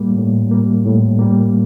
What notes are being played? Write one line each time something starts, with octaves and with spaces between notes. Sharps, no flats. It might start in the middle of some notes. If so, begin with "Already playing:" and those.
Already playing: A2 G3 A#3
A2
G3 A#3
A2
G3 A#3